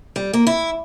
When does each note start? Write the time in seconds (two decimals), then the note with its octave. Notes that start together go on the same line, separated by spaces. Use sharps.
0.16 G3
0.33 A#3
0.47 E4